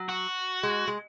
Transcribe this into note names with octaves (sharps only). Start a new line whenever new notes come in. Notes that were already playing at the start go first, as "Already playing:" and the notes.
Already playing: F#3
F#4
G#3
G#3